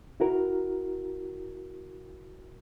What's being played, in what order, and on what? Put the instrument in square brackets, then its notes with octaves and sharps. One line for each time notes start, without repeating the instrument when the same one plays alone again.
[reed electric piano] E4 F#4 A#4